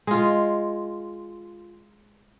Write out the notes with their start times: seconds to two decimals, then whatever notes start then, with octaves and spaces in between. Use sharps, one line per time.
0.07 G#3 F4